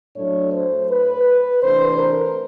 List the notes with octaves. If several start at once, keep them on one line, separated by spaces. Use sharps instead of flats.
A2 F#3 A3 D4 C#5
C5
B4
C3 E3 A3 D4 C5
A#4